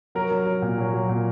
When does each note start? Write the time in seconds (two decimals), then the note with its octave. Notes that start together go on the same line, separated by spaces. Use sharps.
0.15 F#3 A#4
0.31 F#3
0.46 F#3
0.62 A#2
0.78 F#3
0.94 F#3
1.09 A#2